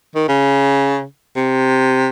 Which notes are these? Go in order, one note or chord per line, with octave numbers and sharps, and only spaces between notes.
D#3
C#3
C3